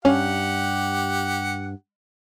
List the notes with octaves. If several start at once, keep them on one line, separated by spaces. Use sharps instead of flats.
G2 C#4 G4 F#5